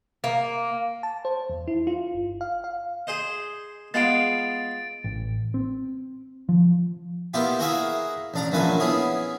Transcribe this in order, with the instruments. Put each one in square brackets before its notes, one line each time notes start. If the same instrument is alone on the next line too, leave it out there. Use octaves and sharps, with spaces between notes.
[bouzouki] A#3
[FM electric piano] A5
C5
E2
E4
F4
G1
F5
F5
[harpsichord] G#4 C5 D#5
[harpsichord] G#3 B3 F4 [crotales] A6 D7
[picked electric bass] A1
C4
F3
[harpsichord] A#2 B3 E4 F4 G4
E4 F#4 G#4 A#4 E5 F5
A1 D4 A#5
A#1 F#2 A#2 A3 B4 G#5
B3 C#4 E4 G#4